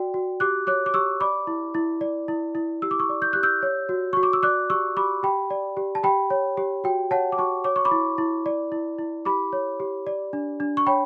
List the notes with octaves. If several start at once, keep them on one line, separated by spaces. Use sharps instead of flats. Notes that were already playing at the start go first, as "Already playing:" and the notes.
Already playing: F#4 D5 G5
F#4
G4 D6 F#6
C#5 D6 F#6
D6
G4 C#6 E6
D5 B5 D6
E4
E4
D5
E4
E4
G4 E6
D6
C#6 E6
D5
G6
G4 F#6
E6 G6
C#5
F#4
F#4 C#6
D6
E6
D5 D6 F#6
G4 C#6 E6
G4 B5 D6
G4 G5 B5
D5
G4
A5
G4 G5 B5
C#5
G4
F#4 G5
C#5 F#5 A5
D6
F#4 A5 C#6
C#5 D6
C#6
B5 D6
E4
E4
D5
E4
E4
G4 B5 D6
C#5
G4
D5
D4
D4
C#6
C#5 G5 B5